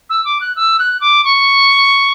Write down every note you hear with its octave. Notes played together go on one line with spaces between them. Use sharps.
E6
D6
F#6
E6
F#6
D6
C#6